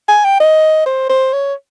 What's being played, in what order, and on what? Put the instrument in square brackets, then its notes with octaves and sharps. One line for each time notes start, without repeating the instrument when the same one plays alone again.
[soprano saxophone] G#5
G5
D#5
C5
C5
C#5